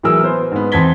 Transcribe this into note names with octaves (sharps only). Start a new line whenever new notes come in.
A2 E3 F#3 G#4 A#4 E6
B3 C5
G#2 B3
E2 C4 A5 G#6 B6 G7